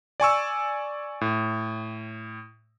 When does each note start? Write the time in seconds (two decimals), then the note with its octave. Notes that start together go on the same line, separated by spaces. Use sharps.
0.20 D5 G#5 C#6 E6
1.21 A2